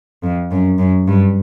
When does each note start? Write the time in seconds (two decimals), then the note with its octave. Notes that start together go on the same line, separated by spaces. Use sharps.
0.23 F2
0.51 F#2
0.78 F#2
1.07 G2